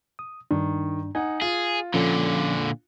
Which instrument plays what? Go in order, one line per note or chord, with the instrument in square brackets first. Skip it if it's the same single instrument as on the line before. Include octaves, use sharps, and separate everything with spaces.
[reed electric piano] D#6
[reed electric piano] G2 D4 [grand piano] D#3
[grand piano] D#4 F#5 [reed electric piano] G#5
[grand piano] F4 [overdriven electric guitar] G#4
[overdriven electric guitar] A#2 D3 [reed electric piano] F3 C#4 A4